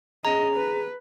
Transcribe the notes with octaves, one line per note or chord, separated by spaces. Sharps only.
C#4 G#4 D#5 A#5
B4